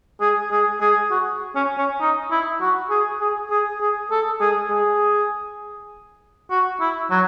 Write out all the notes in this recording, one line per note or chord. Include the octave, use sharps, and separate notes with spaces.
G#4
G#4
G#4
F#4
C#4
C#4
D#4
E4
F#4
G#4
G#4
G#4
G#4
A4
G#4
G#4
F#4
E4
F#3